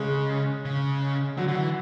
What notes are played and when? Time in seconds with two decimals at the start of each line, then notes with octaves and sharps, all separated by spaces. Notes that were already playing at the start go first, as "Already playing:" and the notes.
Already playing: C#3 G#3
0.65 C#3
1.37 D3 F#3
1.48 D3
1.55 E3